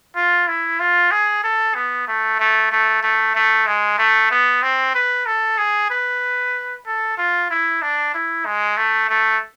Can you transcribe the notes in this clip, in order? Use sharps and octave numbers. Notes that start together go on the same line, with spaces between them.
F4
E4
F4
G#4
A4
B3
A3
A3
A3
A3
A3
G#3
A3
B3
C4
B4
A4
G#4
B4
A4
F4
E4
D4
E4
G#3
A3
A3